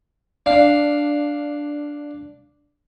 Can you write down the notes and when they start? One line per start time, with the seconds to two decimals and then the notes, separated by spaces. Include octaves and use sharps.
0.46 D4 F5